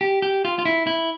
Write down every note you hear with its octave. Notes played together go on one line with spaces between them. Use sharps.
G4
G4
F4
F4
E4
E4